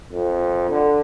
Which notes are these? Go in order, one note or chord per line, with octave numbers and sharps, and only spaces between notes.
F2
D3